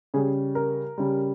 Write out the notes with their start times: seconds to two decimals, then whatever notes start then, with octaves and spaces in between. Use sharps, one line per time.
0.14 C#3 G3 G#4
0.55 A#4
0.98 C#3 G3